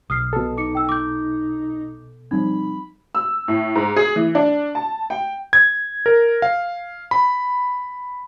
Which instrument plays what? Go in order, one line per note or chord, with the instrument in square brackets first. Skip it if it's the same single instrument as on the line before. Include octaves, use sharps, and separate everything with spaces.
[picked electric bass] B1 [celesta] D#6 F6 C7
[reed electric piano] B2 A4
[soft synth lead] D#4 [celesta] D6 C#7
[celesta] G5 E6
D6 G6
[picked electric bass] F3 G3 C4 [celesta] D#4 [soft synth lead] B5
[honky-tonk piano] E6
A2
G#2
G#4
E3
D4
A5
G5
[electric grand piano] G#6
A#4
F5
B5